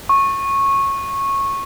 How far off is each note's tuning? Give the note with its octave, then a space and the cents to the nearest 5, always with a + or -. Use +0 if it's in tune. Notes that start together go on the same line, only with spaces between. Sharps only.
C#6 -15